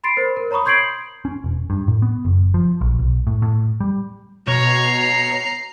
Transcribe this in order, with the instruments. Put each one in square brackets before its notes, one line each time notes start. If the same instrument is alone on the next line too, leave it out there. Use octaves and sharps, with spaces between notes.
[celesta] B5 C6 A6 C7 D7
A#4 C5
A#4
C#5 A#5 B5 C#6 D#6
C6 G6 G#6 C7 D7 F#7
[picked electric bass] C#4
E1
G2
A2
B3
F#1
F3
A#1
B1
A2
A2
G3
[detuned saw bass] B2 [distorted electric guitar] C#5 [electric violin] A#5 C7